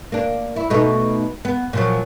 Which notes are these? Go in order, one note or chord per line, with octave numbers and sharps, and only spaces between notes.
A#3 D4
E4
B2 A3 D#4
B3
A#2 F3 F#3